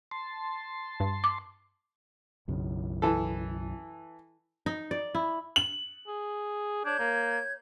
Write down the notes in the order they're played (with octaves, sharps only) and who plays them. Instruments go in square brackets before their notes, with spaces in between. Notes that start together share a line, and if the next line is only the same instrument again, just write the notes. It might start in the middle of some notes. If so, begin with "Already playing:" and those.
[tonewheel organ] A5 C6
[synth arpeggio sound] G2
[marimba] D6
[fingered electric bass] B1 F#2 C#3
[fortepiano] E3 A4
[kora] D#4
D5
E4
[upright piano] F#7
[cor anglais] G#4
[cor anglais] D4 [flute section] C#5 G6 G#6
[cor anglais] A#3